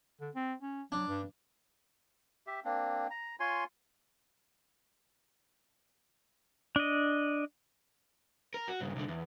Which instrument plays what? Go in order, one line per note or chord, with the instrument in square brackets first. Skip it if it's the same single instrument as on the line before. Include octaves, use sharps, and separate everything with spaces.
[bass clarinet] D3
C4
C#4
[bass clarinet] F#3 [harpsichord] D4
[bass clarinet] G2
[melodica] G4 E5
A#3 C4 D4
A#5
F4 C#5 G#5 C6
[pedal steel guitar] D4 D#5
[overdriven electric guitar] A#4
F#4
G2 C#3
C2 D3
E2